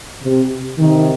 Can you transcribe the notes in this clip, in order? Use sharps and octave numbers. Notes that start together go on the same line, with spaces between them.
C3
C3 D#3